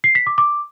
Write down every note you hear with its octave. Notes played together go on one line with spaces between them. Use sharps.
C7
B6
D6
D6